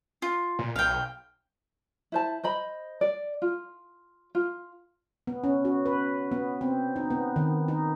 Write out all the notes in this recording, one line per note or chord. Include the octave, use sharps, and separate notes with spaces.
F4
A#2
B1 F5 G5
E4 C5 A5
C5 D#5 B5
D5
F4
F4
B3
C#4
F#4
B4
B3
C4
D#4
B3
D#3
D#4